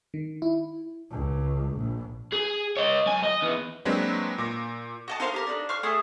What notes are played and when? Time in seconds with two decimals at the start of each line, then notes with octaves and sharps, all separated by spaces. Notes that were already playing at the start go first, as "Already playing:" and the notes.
0.14 D#3
0.42 E4
1.11 C#2
1.76 A#1
2.32 G#4
2.77 C#5 D#5
3.06 B1 G#5
3.23 D#5
3.42 E2 B3
3.85 F#3 G#3 A#3 C4 D4 B4
4.38 A#2 D6 A#6
5.08 F#4 D#5 A5
5.20 D#4 A#4 C5 F5
5.34 G4 A#4
5.47 D4 D#4
5.69 F5 C#6 F6
5.83 A3 G#4 A5 D#6